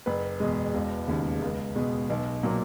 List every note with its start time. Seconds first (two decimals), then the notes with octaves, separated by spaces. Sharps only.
0.06 F#1 B4
0.40 E2 B2 G#3
0.74 E1
1.07 D#2 C#3
1.42 C#2
1.75 B2 G#3
2.10 B1
2.43 A#2 F#3